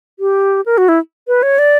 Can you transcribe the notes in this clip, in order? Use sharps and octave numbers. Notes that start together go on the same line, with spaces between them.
G4
A#4
F#4
E4
B4
C#5
D5